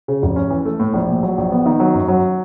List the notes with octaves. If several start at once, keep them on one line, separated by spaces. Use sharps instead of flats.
C#3
F1
C#4
E3
A3
A2
A#1
A#2
F#3
A#1
B3
D#3
F#3
F#2
F#3